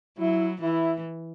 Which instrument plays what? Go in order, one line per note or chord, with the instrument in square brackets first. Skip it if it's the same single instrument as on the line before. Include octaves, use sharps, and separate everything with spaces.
[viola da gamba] F#3 [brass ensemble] E4
[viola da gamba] E3 [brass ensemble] E4